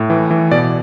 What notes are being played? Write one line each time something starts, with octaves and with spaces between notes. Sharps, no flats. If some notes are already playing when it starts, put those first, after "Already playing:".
Already playing: A2
E3
E3
B2 D5